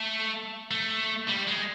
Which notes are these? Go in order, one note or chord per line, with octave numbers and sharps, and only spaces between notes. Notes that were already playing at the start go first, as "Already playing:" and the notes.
Already playing: A3
A3
G3
G#3